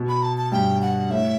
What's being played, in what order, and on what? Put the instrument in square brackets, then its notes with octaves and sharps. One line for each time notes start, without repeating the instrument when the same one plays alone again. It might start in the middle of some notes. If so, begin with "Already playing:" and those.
Already playing: [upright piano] B2
[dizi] B5
A5
A5
[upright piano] G2 [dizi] G5
[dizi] F#5
[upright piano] A2 [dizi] E5